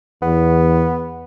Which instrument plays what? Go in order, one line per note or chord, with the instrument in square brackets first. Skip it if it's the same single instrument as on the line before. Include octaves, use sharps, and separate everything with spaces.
[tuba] E2 [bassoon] B3